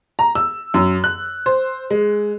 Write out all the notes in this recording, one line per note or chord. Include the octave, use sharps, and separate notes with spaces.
A#5
E6
F#2
F#6
C5
G#3